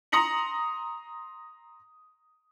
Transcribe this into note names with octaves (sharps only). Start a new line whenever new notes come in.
A#5 C6 D#6 A#6 C#7 F#7